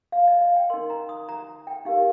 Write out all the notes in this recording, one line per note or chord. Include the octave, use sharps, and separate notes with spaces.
F5
D#5
F5
G5
D#4 A#4 C6
A#5
D#6
A#5
G5
D#4 G4 A#4 F5